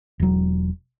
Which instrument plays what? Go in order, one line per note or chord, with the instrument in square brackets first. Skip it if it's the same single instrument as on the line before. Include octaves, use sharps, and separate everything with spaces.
[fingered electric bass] E1 F#3